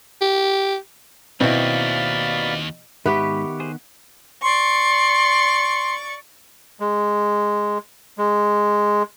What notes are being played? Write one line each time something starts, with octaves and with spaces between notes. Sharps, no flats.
G4
D#2 B2 C4 E4 D5 F5 B5
G#2 D#3 B3 G4 B4 E5 F#5 C#6
G#4 C5
D5 C6 C#6
G#3
G#3